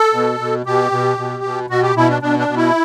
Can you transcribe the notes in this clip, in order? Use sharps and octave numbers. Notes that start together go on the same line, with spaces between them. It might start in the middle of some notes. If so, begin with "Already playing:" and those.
Already playing: A4
B2
B2
B2 G4
B2
B2
B2
B2 F#4
G4
B2 E4
D4
B2 D4
D4
B2
E4